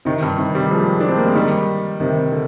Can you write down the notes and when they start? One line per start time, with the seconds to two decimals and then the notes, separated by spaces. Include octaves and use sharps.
0.05 C3 D#3
0.22 G2
0.38 C3 D#3
0.54 D#3 G3
0.71 F3 G#3
1.00 D4
1.08 C4
1.18 A#3
1.26 G#3
1.35 D#3 G3
2.00 C3 D#3
2.32 D3